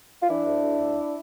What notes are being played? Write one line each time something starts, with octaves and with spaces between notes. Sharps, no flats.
F4
E3 D4 E4
D2
D2
D2